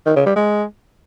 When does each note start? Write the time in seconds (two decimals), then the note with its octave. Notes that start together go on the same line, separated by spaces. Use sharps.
0.06 D#3
0.16 C#3
0.26 G3
0.36 G#3